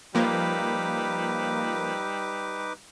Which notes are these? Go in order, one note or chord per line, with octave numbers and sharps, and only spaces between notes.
F3 G3 A#3 D#4 B4 D6